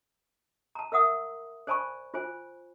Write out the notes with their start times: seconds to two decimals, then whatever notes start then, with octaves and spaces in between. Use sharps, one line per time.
0.75 A5 A#5
0.92 A#4 E5 F#5 D#6 E6
1.67 C5 D5 G#5 A5 B5 C#6
2.14 F4 C5 G#5